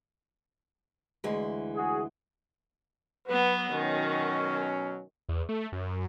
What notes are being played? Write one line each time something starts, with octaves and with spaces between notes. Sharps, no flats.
D2 E3 G#3
F#4 G#4
F#3 B3 B4
B2 D#3 F#3 C#4
E2
A3
F#2